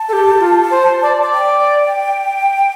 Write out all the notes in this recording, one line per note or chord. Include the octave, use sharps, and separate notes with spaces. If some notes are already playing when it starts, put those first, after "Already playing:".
Already playing: A5
A4
G4
F4
C5
D5
D5
G5